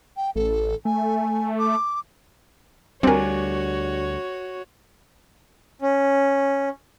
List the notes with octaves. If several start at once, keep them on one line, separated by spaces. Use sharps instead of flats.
G5
A1 A4
A3 G#5
D6
D2 G3 C4 D4 F#4 A#4 C#5 G#5
C#4